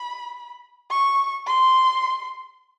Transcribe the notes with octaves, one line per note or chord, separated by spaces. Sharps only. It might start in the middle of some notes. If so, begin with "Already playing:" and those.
Already playing: B5
C#6
C6